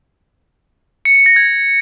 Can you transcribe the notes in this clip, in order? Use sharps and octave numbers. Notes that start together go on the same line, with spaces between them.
C#7
C#7
A#6
G#6